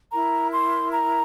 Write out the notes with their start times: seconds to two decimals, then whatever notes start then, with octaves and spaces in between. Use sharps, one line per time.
0.12 E4 A#4 A#5
0.53 C6
0.94 A#5